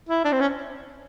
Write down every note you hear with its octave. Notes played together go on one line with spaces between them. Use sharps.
E4
D4
C4
C#4